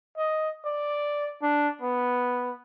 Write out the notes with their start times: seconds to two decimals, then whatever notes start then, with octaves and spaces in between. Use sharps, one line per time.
0.17 D#5
0.65 D5
1.42 D4
1.82 B3